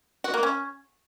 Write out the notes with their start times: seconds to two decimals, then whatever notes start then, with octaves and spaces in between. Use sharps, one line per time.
0.24 F#4
0.34 A#3
0.43 C#4